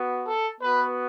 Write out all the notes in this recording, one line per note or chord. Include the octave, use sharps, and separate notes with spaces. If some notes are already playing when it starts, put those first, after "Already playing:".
Already playing: B3 F#4
A4
B3 F#4 B4